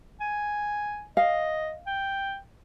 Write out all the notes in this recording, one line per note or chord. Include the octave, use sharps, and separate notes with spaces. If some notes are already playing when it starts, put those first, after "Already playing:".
G#5
D#5 F5
G5